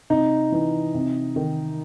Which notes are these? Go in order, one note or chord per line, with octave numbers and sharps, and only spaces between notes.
C3 D#4
E3
C3
D#3